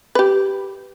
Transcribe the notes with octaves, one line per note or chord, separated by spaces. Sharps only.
G4 B4